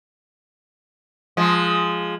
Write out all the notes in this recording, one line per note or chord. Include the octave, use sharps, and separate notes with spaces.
F3 G#3